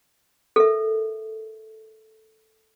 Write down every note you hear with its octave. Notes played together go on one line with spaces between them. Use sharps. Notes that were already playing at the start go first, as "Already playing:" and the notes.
A4 A#4 E5